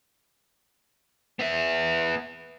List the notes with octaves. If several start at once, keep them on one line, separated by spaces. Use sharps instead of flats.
B3 E5